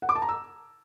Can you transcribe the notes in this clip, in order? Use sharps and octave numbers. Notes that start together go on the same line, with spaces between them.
F#5
D6
A5
A#5
E6